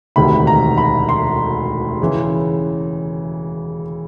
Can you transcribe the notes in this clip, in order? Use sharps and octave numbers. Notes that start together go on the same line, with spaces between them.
E1 D2 C3 D#3 B5
A#5
B5
C6
C#3 E3